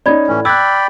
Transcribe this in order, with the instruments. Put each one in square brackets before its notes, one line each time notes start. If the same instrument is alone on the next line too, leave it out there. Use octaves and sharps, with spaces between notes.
[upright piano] C#4 D#4 [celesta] D5 B5 G#6
[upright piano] A2 [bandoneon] E3 C#4
[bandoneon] D5 G5 B5 [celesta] E6 F#6 [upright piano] G#6